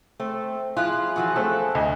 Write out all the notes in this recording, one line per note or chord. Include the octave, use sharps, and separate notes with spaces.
A3 C4
F3 E4 F4 G#4 F#6
E3 F3 F#4
A3 C4 A4
D2 D#5